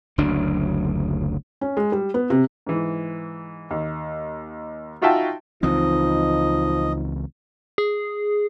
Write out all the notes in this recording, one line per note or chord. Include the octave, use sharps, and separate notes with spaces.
F#1 D2 F#3 D4
C#4
G#3
G3
B3
C3
G#2 E3
D#2
D#4 F4 F#4 E5 G5 A5
C#2 E3 F3 C4 D#4 D#5
G#4